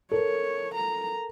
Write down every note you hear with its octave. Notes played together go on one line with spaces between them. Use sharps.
A4 A#4 C#5
A#5